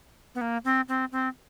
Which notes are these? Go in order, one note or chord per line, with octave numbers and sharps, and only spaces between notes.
B3
A#3
C4
C4
C4